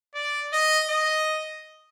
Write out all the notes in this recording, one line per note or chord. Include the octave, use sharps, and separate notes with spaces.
D5
D#5
D#5